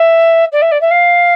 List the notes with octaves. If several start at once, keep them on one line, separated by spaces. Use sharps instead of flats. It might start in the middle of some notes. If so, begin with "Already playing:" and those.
Already playing: E5
D5
E5
D5
E5
F5